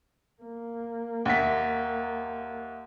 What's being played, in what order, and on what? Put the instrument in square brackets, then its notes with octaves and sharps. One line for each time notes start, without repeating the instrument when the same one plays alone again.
[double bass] A#3
[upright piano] D#2 B6 [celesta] E5 F#5